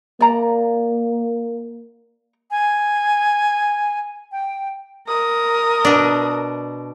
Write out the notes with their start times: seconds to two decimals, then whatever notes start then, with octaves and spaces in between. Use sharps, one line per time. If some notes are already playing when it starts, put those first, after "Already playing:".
0.20 A#3 D5 A#5
2.51 G#5
4.32 G5
5.08 A#4 D#6
5.85 B2 D4